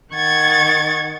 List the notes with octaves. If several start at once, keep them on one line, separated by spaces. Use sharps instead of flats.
D#3 F#5 C#6 G#6 A6